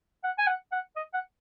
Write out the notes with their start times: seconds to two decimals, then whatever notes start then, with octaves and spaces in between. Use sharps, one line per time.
0.23 F#5
0.38 G#5
0.47 F#5
0.72 F#5
0.96 D#5
1.14 F#5